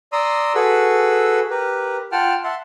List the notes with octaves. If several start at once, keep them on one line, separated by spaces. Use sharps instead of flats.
D5 A#5 C6 D#6 E6
F#4 G#4 A4 B4 B5 E6
G4 A#4 B4
F4 F#5 G5 A5 F6
E5 F#5 A5 C6